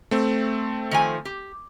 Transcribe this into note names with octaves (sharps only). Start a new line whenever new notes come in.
A3 C4
D#3 F3 G#5
G4